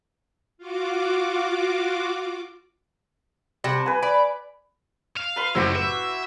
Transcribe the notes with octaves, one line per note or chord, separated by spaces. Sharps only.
F4 F#4 D6
C3 G3 F#5 A5
B4 G#5
D5 B5
F5
B4 C6
F#1 D2 A2 E4 F#4 G4 C5
B4 E5